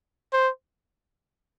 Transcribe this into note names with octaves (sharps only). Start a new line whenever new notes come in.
C5